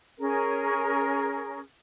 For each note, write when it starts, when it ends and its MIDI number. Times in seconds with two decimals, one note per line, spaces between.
0.19 1.59 61
0.19 1.59 68
0.19 1.59 70